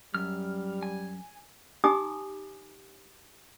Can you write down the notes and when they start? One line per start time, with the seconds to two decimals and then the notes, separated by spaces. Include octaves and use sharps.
0.14 F#2 G3 F6
0.83 G#5
1.84 D#4 G4 G#5 A#5 D6 D#6